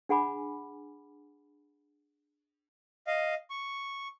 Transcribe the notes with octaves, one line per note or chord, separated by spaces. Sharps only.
D4 G#4 F#5 G#5 B5 D6
D#5 F5
C#6